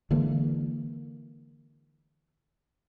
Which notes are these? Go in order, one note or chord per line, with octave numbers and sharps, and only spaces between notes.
D3 E3 G#3 A#3